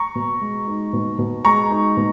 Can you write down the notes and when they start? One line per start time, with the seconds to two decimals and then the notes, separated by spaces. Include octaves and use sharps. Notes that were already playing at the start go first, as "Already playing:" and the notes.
Already playing: A#5 C#6
0.15 B2
0.41 G#3
0.67 D#4
0.93 B2
1.19 B2
1.45 G#3 A#5 C#6
1.70 D#4
1.97 B2